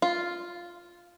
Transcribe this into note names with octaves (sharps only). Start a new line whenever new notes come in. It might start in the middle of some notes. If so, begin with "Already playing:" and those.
F4